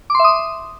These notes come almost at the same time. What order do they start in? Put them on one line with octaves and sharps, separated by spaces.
D6 C6 E5 D#6